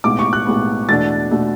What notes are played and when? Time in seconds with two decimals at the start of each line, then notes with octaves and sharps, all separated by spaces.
0.04 B1 A2 G#3 B3 D6
0.19 C#6
0.33 F#6
0.46 B1 A2 G#3 B3
0.89 E2 B2 A3 D4 A6
1.31 B2 A3 D4